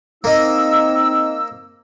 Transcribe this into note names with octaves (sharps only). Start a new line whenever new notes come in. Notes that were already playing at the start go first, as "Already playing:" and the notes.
A#3 C4 D#4 D#5 E6